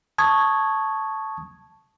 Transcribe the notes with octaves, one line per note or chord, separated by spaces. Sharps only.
A5 C#6 D#6 G#6